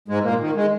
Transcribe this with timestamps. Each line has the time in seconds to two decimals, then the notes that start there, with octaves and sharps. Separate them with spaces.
0.08 G#2 G#3
0.23 A#2 A#3
0.40 D#3
0.55 G#3